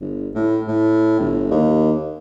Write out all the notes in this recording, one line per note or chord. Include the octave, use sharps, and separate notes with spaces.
G1
A2
A2
G1
D#2